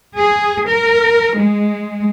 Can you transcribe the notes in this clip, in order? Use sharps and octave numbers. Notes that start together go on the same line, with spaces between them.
G#4
A#4
G#3